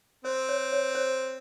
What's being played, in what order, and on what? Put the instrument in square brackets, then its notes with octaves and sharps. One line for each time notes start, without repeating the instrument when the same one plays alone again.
[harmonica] C4 [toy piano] C5
[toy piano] C#5
C#5
C5